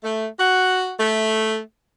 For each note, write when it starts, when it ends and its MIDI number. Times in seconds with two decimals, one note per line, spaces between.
0.04 0.26 57
0.39 0.91 66
0.99 1.60 57